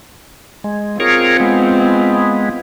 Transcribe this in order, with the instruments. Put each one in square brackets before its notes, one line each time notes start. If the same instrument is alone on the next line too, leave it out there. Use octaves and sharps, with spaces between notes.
[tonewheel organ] G#3
[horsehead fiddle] C4 F4 [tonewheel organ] G#4 A#4 C#5
[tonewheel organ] G#3 B3